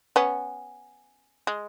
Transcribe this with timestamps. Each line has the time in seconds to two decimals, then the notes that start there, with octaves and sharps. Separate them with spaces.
0.16 B3 C#4
1.47 G#3